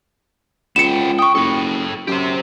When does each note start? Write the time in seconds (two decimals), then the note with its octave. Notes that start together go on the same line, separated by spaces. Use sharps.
0.76 C#2 B3 G5 C#7 E7
1.19 G5 C#6 D#6
1.35 F#1 A4 G5
2.08 F#2 G4 C5